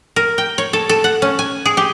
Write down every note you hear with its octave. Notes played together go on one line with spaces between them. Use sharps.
A#4
G5
C#5
A4
A4
F#5
C#4
G#5
G#4
G4